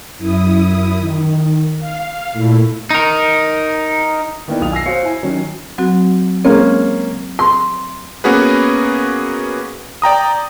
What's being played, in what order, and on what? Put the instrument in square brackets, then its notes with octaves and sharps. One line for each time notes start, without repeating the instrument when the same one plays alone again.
[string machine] F#2 E4 D#6
D#3
F5
A#2 A3 E4
[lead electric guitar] D#4 A#4
[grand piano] D#3 A#3 B3 E4 D5 G5
B1 F4 D#6 F7
G#5 E6 A#6 C7
F#4 C5 C#5 F5 C#7
E4 G#5
D#3 F#3 C#4
[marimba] F#3 C4 F#4
[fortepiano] G#3 A#3 C#4 [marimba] C4
[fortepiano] C6
[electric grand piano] A#3 B3 C#4 F#4 G#4 B4
D5 G5 A#5 D#6